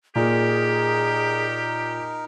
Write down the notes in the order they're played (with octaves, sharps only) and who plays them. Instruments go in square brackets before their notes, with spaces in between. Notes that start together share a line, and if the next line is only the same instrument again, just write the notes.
[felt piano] A#2 [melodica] D#4 A#4 [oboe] G4 [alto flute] G#4